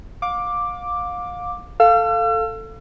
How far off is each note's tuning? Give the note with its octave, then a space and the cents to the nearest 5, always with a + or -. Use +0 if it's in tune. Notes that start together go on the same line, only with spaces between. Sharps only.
F5 +30 D6 +0
A4 +5 F5 +0 E6 +40